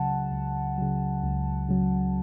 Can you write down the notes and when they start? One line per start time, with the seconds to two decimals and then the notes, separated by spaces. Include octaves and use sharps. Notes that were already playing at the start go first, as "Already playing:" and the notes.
Already playing: C#2 C#3 F#3 F#5 A5
0.32 C#2
0.78 C#3 F#3
1.23 C#2
1.69 C#3 F#3